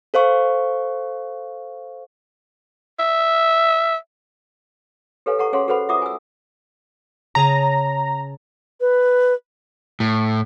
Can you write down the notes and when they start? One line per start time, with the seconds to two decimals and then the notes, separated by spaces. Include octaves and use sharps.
0.14 A4 C5 F5 C#6
2.99 E5
5.26 G4 A4 B4 C#5 F5 G#5
5.39 A4 F#5 A#5 C#6
5.53 C#4 G#4 C#5 F5 F#5 C6
5.68 F#4 A4 B4 C5 F#5 B5
5.89 F4 E5 F#5 A#5 D6 D#6
6.02 G#5 E6
7.35 C#3 G#4 A5 A#5
8.81 B4
10.00 A2